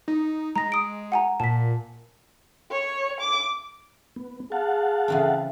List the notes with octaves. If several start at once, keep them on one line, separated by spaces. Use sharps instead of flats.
D#4
G#3 A#5 A#6
D#6 D7
F#5 G#5 A#5
A#2 A5 B6
C#5
D6
B3
G#4 F5 F#5 A5
C#3 E3 C4